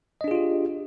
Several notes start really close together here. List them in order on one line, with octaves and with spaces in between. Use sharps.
D#5 D4 G#4 F4 G4